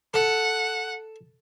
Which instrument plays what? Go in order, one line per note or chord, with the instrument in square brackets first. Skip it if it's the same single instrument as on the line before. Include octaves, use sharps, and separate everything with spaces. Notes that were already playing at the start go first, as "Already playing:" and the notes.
[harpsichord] A4 [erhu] F#5